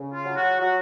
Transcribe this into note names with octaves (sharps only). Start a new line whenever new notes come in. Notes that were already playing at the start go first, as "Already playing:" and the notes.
Already playing: C#3
F4
F#3
F#4
F#3 F#4